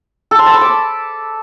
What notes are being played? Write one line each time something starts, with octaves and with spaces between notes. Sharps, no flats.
A4
C6
A5
B5
D6